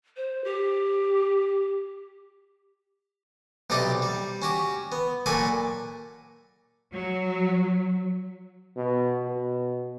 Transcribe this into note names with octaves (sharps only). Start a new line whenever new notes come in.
C5
G4
B1 C3 D#4 G4 D5 D#5
G3
C#4 F#4 G4
B3
A#2 F#3 A4 G#5 B5 D6
F#3
B2
B2